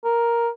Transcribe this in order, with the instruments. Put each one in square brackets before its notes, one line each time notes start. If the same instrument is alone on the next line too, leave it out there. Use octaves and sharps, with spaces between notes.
[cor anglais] A#4